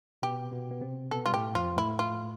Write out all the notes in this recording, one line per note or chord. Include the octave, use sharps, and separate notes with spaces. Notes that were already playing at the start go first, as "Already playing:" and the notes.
B2 B3 G4
B2 B3
B3
C3 C4
B2 B3 A4
G3 F4
A2 A3 G4
F2 F3 F4
A2 A3 E4
F4